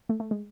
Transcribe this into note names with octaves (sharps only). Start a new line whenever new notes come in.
A3
A3
G#3